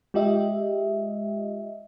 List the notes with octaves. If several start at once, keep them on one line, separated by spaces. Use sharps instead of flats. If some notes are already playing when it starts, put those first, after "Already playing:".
G#3 F4 G4 D#5 E5